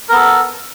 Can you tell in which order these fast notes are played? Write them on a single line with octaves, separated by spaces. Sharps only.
A#4 B3 A4